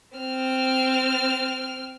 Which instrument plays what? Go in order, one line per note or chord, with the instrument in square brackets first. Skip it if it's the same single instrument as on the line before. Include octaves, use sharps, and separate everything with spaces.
[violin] C4 F6